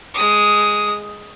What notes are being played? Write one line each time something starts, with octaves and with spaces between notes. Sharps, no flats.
G#3 D#6